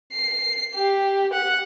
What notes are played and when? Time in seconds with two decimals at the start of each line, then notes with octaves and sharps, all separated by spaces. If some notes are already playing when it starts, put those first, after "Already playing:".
0.13 C7
0.75 G4
1.34 F#5